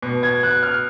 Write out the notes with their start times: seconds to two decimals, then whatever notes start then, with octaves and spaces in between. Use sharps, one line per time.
0.02 B2
0.23 G#6
0.43 F#6
0.63 F6